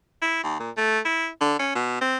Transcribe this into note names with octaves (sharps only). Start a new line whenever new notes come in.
E4
D#2
A#2
A3
E4
D3
C#4
B2
C4